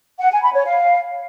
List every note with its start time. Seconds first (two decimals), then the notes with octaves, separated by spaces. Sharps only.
0.20 F#5
0.31 G#5
0.43 B5
0.54 C#5
0.66 F5